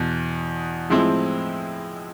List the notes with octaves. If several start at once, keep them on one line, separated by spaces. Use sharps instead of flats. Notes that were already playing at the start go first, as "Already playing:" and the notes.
Already playing: E2 B2
A2 F3 G#3 C4 E4